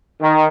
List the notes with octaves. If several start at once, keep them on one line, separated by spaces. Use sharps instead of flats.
D#3